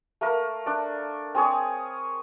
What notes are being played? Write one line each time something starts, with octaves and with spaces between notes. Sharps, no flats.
A3 A#3 A#4
D4 D5
C4 G#4 C#5 D#6